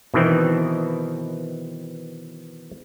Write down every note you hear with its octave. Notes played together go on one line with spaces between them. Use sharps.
B2 D#3 E3 C4